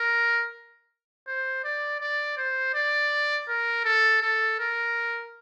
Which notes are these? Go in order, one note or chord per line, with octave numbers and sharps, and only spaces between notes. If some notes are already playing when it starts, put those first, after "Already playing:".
Already playing: A#4
C5
D5
D5
C5
D5
A#4
A4
A4
A#4